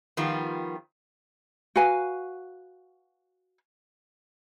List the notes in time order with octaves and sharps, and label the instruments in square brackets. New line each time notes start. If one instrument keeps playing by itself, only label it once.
[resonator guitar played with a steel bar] D#3 F3 G3 B3 F4
[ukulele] F#4 B4 F5 G#5